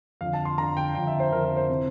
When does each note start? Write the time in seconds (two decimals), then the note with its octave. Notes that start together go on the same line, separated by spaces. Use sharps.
0.21 F2 D3 F5
0.33 A5
0.45 C6
0.58 F2 D3 A#5
0.77 G5
0.95 F2 D3 G5
1.07 E5
1.20 C5
1.32 F2 D3 A#4
1.45 A#4
1.57 C5
1.69 C3 E3